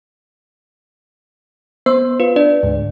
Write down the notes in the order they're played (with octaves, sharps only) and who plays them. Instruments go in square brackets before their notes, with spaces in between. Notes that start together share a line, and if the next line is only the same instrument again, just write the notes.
[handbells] B3 [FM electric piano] C5
[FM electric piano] F4 [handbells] B4
[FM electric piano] D4 [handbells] D5
[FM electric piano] D2 G#2